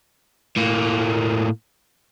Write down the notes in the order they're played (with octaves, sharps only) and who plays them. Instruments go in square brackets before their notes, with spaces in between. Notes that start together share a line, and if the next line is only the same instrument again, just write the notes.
[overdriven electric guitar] A2 A#3